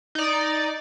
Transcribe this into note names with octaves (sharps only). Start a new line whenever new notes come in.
D#4 D5